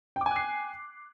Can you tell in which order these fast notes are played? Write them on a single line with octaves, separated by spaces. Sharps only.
G5 D6 G#5 F#6 C7